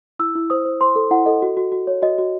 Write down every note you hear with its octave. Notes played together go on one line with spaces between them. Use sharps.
E4 E6
E4
C5 D#6
C5
C5 C6
A4
E4 F#5
A4 D#5
F#4
F#4
F#4
C#5
F#4 D#5
F#4